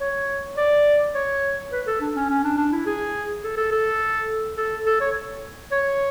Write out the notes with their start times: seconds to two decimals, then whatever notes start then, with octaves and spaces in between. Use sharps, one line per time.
0.01 C#5
0.58 D5
1.15 C#5
1.72 B4
1.87 A4
2.01 D4
2.16 C#4
2.29 C#4
2.44 D4
2.58 D4
2.72 E4
2.86 G#4
3.44 A4
3.57 A4
3.72 A4
4.57 A4
4.86 A4
5.01 C#5
5.72 C#5